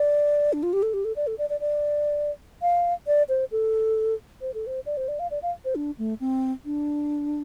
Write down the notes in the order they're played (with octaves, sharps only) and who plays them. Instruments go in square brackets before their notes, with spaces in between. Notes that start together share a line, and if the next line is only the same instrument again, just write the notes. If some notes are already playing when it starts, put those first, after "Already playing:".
Already playing: [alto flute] D5
D4
F4
G4
A4
G4
A4
D5
A4
D5
D5
D5
F5
D5
C5
A4
C5
A4
C5
D5
C5
D5
F5
D5
F5
C5
D4
A3
C4
D4